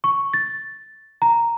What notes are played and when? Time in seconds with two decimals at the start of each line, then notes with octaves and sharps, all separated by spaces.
0.04 C#6
0.34 A6
1.22 A#5